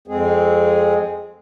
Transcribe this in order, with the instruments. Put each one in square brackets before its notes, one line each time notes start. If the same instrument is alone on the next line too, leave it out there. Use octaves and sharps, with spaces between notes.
[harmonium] F2 G#3 C4 G#4